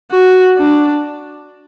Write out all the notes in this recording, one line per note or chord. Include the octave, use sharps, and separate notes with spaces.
F#4
D4